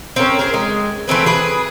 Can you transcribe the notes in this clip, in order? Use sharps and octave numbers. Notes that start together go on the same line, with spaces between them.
C4 C#4 A#4
G#4 A#4
G#3
E3 A3 C4 B4
G#4 B4